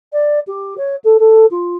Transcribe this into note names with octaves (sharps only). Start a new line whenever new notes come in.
D5
G4
C#5
A4
A4
F4